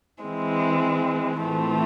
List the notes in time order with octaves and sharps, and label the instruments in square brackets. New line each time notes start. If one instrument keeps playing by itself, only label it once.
[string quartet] E3 G#3 C4
A2 E3 A3 C4 F4